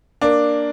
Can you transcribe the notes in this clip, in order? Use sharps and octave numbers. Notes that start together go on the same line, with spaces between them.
A#3 D4